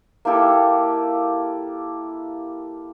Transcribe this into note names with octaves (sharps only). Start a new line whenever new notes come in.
A#3 E4 G4 A4